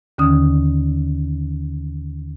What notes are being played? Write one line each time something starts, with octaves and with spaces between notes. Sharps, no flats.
D#2 D3 D#3 C#4 D#6